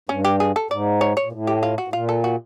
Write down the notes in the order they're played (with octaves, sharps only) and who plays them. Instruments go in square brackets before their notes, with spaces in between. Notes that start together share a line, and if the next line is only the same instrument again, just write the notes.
[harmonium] G2 [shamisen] C#4
[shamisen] G4
G#4
A4
[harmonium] G#2 [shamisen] D5
[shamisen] C#5
C#5
[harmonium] A#2
A2
[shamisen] G4
F4
F#4
[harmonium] A2
[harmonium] A#2 [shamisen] F4
[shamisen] A4
F#4